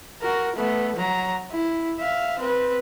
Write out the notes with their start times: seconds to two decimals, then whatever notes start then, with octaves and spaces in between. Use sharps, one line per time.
0.22 F#4 A#4
0.56 A3 B3
0.96 F#3 A#5
1.51 E4
2.00 E5 F5
2.39 C4 B4